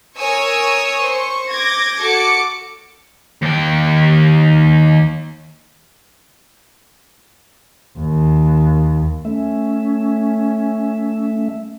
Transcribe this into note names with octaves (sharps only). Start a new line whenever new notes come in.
A#4 C#5 G#5 C#6 D#6 E6
C5 C#6
D6 G6 G#6 A#6
F#4 A4 D6 C#7
D#2 G5
D#2
A3 C#4 E5